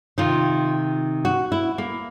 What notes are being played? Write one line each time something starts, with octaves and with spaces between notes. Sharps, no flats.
C3 D#3 F4
F#4
E4
A#3